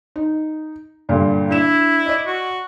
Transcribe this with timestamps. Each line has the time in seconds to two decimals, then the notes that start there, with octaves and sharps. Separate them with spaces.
0.16 D#4
1.09 G2 A#2 D3
1.51 D4 E4 E7
2.06 D5 D#5
2.27 F#4